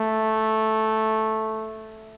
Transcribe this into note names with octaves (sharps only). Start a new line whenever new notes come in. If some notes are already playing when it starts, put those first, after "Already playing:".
Already playing: A3